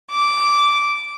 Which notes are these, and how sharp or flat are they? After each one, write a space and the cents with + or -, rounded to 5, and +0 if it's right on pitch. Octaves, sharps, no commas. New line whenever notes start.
D6 -10